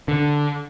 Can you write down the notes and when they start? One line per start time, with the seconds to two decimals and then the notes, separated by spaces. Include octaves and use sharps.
0.08 D3